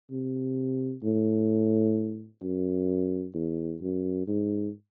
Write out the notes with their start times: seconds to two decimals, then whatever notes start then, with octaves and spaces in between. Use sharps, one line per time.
0.11 C3
1.03 A2
2.43 F#2
3.34 E2
3.82 F#2
4.28 G#2